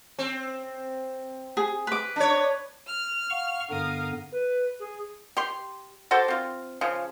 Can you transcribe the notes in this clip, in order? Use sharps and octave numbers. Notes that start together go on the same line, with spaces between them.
C4
G#4
B4 D6
D4 C#5
F6
F5 F#5 C#6
G2 D3 B3 A#4 F5 D#6
B4
G#4
G4 C6
F#4 A4 C5 D5
C4 F4
C#3 F3